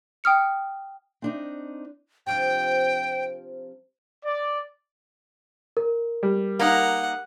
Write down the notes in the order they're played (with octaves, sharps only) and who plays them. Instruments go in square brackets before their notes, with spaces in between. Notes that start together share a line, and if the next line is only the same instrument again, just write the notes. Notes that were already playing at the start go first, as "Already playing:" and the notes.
[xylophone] G5 D#6 F6 C#7
[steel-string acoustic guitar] C4 D4 D#4
[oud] C3 F3 D4 [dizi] G5
[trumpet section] D5
[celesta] A#4
[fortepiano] G3
[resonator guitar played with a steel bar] A#3 D#4 [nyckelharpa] F#5